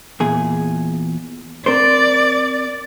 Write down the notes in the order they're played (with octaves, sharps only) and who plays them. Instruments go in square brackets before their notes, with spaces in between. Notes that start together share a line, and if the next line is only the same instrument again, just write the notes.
[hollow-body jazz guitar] E2 A#2 G#4
[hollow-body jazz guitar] C4 A#4 C5 [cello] D5